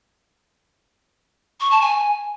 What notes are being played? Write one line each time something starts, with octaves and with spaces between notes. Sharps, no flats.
C#6
A5
G#5